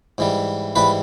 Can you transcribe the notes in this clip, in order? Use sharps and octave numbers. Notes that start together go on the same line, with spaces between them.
G#2 E3 G3
G#2 E3 G3 B4 B5